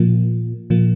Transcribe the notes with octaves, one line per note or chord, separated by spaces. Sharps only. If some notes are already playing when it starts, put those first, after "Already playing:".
Already playing: A#2 F3 A#3
A#2 F3 A#3